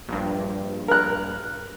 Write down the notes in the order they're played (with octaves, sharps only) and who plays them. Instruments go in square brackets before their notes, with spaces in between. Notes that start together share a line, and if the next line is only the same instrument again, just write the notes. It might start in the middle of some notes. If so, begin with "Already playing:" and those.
[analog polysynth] A#1 G2
[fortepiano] A#4 F#6